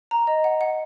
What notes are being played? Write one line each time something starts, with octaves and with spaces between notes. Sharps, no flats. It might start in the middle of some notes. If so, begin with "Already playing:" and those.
A#5
D#5
F#5
F#5